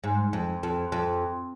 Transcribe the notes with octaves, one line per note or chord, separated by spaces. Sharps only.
G#2
F2
F2
F2